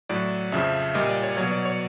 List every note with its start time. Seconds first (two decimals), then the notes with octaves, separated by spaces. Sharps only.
0.09 A2 F#3 D5
0.52 F2 C#3 F3 E5
0.94 A#2 G3 D#5
1.09 D5
1.23 C#5
1.37 B2 F#3 C#5
1.51 D5
1.65 C#5